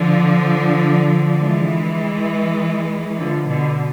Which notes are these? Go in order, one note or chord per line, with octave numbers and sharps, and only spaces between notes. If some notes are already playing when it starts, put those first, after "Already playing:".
Already playing: D3 F3
E3 G#3
D3 F3
B2 D3